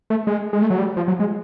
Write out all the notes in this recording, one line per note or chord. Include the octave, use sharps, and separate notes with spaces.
A3
G#3
G#3
A3
F#3
G3
F3
F#3
G#3